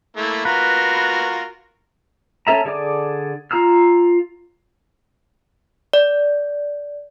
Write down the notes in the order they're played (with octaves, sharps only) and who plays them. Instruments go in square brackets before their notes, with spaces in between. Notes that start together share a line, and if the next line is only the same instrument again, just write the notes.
[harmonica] A3 A#3 E4
[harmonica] F4 F#4 A#4 [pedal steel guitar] B4
[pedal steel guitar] C#4 A4 E5 A#5
D3 G#4 A4 D5 D6
F4 A#5 E6 F6
[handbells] D5